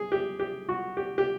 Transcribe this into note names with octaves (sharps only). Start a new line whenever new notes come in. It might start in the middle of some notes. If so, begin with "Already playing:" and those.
Already playing: G#4
G4
G4
F#4
G4
G4